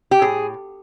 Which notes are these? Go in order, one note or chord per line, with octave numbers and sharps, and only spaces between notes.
G4
A2 G#4